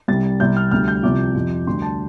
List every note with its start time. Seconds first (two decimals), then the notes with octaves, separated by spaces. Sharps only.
0.08 C2 C3 G3 A6
0.40 C2 C3 G3 G6
0.57 F6
0.71 D2 D3 G3 F6
0.88 G6
1.03 C2 C3 F3 D6
1.35 F2 C3 F3
1.67 D2 D3 G3 C6
1.82 A5